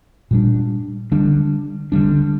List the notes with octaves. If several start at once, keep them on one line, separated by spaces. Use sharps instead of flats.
A#2 G3 D4
D3 G3 D4
D3 G3 D4